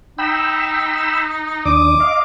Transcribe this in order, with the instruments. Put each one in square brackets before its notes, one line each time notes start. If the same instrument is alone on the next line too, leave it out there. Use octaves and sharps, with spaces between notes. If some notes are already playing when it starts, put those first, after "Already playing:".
[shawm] D#4 [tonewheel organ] G5 B5 E6
[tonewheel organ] D#2 D4 D#6 [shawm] D6
[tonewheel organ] D#5 F5